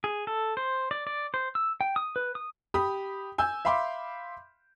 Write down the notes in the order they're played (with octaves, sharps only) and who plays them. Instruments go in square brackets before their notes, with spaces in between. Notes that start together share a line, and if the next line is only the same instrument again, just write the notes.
[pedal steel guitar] G#4
A4
C5
D5
D5
C5
E6
G5
D#6
B4
D#6
[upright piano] G4 B5 D#6
G#5 E6 G6
E5 F5 B5 C6 D6